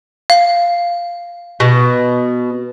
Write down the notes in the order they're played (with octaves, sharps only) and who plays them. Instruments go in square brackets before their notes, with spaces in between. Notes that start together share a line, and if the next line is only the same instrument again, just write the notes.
[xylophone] F5
[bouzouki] B2